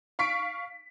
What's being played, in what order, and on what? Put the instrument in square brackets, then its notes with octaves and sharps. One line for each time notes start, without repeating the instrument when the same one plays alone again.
[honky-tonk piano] F5 C#6 B6 D7